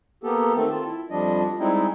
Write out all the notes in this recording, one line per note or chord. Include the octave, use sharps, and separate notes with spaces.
A#3 B3 G4 A4
D#3 A3 C4 A4
C4 F4 A5
E4
F2 F3 G3 D4 D#5
G3 G#3 C4 D#4 E4